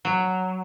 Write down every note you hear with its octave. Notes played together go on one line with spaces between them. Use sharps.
F#3